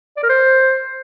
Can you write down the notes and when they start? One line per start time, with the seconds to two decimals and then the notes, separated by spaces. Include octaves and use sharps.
0.17 D5
0.23 A#4
0.29 C5